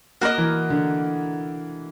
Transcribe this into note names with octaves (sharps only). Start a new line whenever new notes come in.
A#3 F#4 A#4 D#5
E3
D3